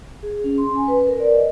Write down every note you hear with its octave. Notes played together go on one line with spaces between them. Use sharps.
G#4
C#4
C6
G#5
B4
A#4
D5
D#5